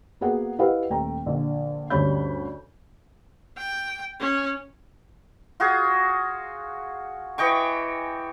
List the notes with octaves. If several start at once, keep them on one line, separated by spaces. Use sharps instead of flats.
A#3 B3 F#4 G#4 F#5
E4 G4 B4 D#5 F5 F#5
D#1 A3 G5 A#5
A#1 D3
D2 G2 C#4 C#5 B5 G6
G5
C#4
F4 F#4 G#4
E3 D#5 G5 C#6